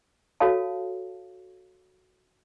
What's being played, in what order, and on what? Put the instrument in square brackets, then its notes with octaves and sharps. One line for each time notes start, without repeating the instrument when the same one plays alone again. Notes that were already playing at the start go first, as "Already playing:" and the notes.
[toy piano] F#4 A4 C#5 F5 A5